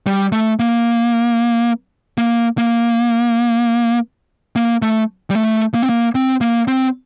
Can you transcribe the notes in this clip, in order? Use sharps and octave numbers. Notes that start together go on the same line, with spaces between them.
G3
A3
A#3
A#3
A#3
A#3
A3
G3
A3
A#3
C4
A#3
C4
A#3
C4